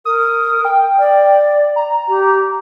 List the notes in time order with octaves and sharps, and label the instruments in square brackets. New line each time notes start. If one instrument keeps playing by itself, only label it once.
[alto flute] A#4 [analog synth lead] D#6
[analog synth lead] G5
[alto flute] D5
[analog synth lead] A#5
[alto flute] G4